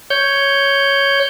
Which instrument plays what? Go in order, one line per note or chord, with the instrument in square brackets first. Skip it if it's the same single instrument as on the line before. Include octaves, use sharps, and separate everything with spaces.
[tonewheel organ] C#5 G6